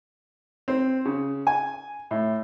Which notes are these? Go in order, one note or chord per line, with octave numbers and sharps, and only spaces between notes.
C4
C#3
G#5
A2